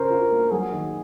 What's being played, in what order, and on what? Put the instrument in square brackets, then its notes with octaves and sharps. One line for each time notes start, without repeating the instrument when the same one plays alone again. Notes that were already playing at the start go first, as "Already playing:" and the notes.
Already playing: [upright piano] C#3 C#4 C5 [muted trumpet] A#4
[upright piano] F4
A#3
[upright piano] F#3 [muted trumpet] G#4
[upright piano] D#3